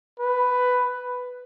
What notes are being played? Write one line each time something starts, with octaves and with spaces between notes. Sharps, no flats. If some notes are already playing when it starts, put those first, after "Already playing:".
B4